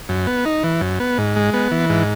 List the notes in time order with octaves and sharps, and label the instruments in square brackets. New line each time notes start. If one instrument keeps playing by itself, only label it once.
[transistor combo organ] F#2
B3
D#4
E3
F#2
B3
G#2
G#3
B3
E3
G#2